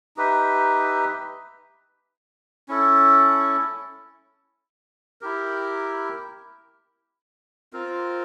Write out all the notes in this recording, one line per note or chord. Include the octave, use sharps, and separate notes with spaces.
D#4 G4 B4 E5
C#4 E4 A4
E4 G4 A#4
C4 F4 A#4